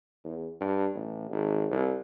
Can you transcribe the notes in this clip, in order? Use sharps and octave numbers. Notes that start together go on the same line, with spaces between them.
E2
G2
A1
G#1
C2